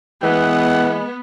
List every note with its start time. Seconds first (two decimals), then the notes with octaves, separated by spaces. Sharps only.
0.23 E3 G#3 B3 F#5